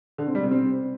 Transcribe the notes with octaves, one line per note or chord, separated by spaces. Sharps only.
D3
C4
G3
C3
C4